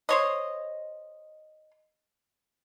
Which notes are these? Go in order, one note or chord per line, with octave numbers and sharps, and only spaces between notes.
C5 C#5 D#5